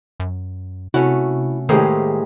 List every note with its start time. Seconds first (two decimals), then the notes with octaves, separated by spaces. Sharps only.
0.20 F#2
0.94 C3 A3 C#4 E4 F#4
1.69 A2 D#3 G#3 A#3 G4 G#4 C5